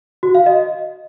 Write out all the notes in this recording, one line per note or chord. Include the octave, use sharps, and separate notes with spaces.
F#4
F5
D#5